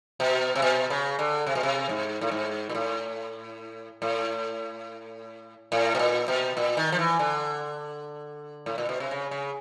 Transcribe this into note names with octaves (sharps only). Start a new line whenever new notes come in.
B2
C3
B2
C#3
D3
C3
B2
C3
G#2
A2
G#2
A#2
A2
A2
A2
B2
A#2
B2
A#2
D#3
F3
E3
D3
A2
A#2
B2
C3
C#3
C#3